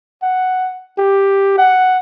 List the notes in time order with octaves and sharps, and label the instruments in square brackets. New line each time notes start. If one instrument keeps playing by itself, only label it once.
[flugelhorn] F#5
G4
F#5